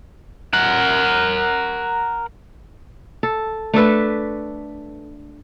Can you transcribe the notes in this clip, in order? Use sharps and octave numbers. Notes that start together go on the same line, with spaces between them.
A#4 F#5
A4
A3 D4 A4 B4